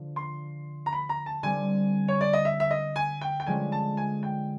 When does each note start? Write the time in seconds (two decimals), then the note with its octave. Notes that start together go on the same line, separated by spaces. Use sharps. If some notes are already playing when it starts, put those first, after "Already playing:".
Already playing: D3 F3
0.16 C6
0.86 A#5
0.93 B5
1.09 A#5
1.26 A5
1.43 D3 G3 C4 G#5
2.08 C#5
2.21 D5
2.33 D#5
2.45 E5
2.60 E5
2.71 D#5
2.96 G#5
3.21 G5
3.40 G5
3.47 D3 F3 G#3 C#4 G#5
3.72 A5
3.97 G#5
4.23 G5